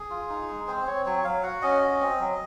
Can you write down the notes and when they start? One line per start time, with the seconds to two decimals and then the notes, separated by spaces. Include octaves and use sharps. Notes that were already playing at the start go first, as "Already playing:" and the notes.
Already playing: G#4
0.10 F4
0.29 D#4
0.48 G#3
0.68 C4 C5
0.87 C4 C#5
1.05 F#3 C#5
1.24 F#3 F5
1.43 F#4 F#5
1.62 C#4 D#5
1.82 F#4
2.01 C4
2.20 F#3